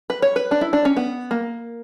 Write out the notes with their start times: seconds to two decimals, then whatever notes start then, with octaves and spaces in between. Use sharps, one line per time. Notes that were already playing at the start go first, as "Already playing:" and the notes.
0.10 B4
0.22 C#5
0.36 B4
0.51 D4
0.61 E4
0.73 D4
0.85 C#4
0.97 B3
1.31 A#3